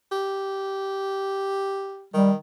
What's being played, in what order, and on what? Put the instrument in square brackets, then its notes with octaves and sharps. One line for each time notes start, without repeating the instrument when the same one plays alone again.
[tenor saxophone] G4
[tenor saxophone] D#3 [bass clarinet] G3